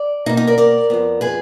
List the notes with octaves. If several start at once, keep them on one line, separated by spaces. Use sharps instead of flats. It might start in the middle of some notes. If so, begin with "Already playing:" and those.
Already playing: D5
B2 A#3 D#4
D#4
A#4 D5
A#4 D5
F2 F3 B3
G#4 B4